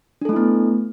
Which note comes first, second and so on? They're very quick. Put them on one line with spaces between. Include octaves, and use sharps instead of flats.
D4 A4 A3 E4 B3